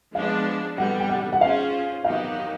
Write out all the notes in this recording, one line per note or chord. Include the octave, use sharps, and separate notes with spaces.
F3 G#3 B3 D4 F5
D3 G3 B3 F#5
G5
F#5
F#5
C#4 F4 G#4 C5 F5
D#3 F#3 B3 D#4 G4 F5